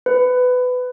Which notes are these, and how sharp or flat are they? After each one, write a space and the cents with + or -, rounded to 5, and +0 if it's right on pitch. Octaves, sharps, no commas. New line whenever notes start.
B4 +20